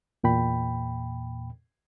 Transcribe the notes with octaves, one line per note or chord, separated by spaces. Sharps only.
E2 A#2 G5 B5